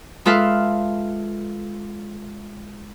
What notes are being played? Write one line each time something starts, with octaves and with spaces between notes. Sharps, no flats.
G#3 F4 A4 B4 E5 F5